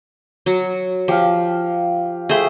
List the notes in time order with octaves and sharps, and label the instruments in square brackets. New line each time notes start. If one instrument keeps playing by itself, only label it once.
[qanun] F#3
[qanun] F3 [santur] G4 F5
[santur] A3 E5 G5 [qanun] G#4 C5